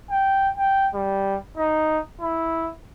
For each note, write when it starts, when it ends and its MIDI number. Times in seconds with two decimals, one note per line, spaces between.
0.10 0.49 79
0.57 0.88 79
0.94 1.37 55
1.57 1.99 63
2.21 2.70 64